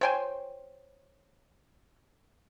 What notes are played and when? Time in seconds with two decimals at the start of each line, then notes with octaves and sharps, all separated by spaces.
0.01 C5 C#5 G5 G#5